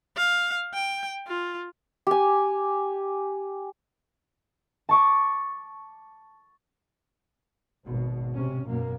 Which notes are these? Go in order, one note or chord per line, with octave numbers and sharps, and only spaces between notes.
F5
G5
F4
G4 G#5
A5 C#6 D6
G#1 B2
C3 C#4
F#2 B2 A#3